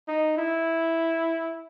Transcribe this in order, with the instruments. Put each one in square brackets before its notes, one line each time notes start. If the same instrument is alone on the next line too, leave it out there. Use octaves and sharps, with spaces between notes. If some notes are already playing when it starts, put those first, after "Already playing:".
[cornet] D#4
E4